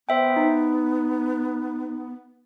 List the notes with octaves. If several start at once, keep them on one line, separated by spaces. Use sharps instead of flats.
B3 C5 E5 G5
D#4